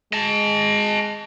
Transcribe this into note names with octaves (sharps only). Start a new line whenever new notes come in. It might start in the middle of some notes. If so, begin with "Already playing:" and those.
G#3 D#5 A5